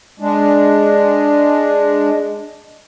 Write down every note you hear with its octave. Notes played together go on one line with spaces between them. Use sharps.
G#3 D4